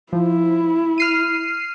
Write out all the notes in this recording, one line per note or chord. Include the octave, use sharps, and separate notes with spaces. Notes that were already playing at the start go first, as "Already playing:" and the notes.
F3 E4
F6 C7 D#7